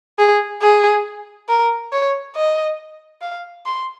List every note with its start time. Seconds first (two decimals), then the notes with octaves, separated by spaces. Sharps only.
0.19 G#4
0.62 G#4
1.49 A#4
1.92 C#5
2.35 D#5
3.22 F5
3.66 C6